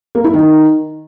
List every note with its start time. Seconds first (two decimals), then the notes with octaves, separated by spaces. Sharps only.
0.15 A#3
0.24 E4
0.34 D#3